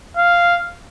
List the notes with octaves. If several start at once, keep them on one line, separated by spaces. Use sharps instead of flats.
F5